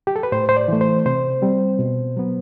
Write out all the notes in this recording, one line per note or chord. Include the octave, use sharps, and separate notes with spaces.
G4
A4
B4
A2 C5
C5
D5
E3 A3
C5
C3 C5
G3 C4
B2
F#3 B3